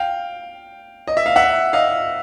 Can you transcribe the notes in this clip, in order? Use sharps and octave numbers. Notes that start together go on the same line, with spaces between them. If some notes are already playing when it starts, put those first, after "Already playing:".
Already playing: F5 G5
D#5
E5
F5
E5 F#5
D#5 F5